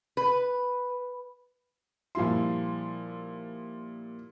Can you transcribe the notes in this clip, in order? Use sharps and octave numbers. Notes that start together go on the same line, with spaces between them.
B4
A#2 F3 G3 E4 C6